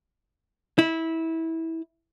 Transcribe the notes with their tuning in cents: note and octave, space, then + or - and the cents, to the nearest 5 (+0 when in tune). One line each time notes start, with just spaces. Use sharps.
E4 -20